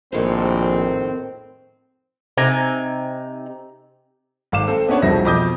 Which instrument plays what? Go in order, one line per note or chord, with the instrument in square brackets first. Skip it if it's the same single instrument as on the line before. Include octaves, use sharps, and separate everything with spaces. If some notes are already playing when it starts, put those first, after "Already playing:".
[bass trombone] A#1 [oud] F2 A2 D#3 [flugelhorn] C4 [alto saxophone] C5
[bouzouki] C3 D#4 G#5
[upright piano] G#1 F5 D6 E7
C4 A4 C5
B3 C#4 D4 C#5 F#5 A5
E1 C2 F3 C4 E5 A#6
F2 B2 D6 D#6 G6